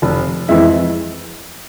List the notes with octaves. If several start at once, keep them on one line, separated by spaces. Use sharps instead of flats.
F1
F2 E3 G#3 E4